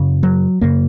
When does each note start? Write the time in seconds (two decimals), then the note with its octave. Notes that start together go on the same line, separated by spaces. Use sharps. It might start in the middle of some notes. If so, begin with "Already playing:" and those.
Already playing: F#2 C#3
0.23 F#3
0.61 F#2 C#3 A#3